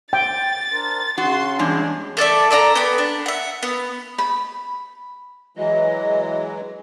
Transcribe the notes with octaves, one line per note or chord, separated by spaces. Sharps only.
G5 A6
D4 A#4 C5
C#3 C#4 F#4 C6
E2 G2 G#3 D4
A3 A4 D5 E5
A4 D5 E5 A#5
B3 G5 B5
D4
E5 F#5
B3
B5
E3 F#3 G#3 D#5